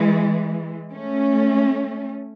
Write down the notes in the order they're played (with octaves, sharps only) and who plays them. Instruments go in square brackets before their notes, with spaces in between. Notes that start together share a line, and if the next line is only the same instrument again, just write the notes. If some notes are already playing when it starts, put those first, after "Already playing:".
Already playing: [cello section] E3 G#3
A3 C#4